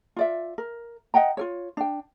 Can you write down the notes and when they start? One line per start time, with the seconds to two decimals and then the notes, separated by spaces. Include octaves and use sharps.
0.16 F4 D5 E5
0.58 A#4
1.14 D#5 F#5 G5 A#5
1.37 F4 A#4 C#5
1.77 D4 G5